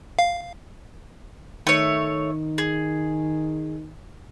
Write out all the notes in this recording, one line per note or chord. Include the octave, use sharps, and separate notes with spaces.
F5
D#3 A3 C#5
G#4